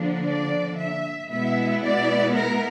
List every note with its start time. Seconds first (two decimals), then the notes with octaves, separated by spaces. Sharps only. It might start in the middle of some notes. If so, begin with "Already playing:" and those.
Already playing: D3 F3 A#3 D4
0.25 D5
0.77 E5
1.29 B2 G#3 B3 E4 E5
1.81 D5
2.33 A#4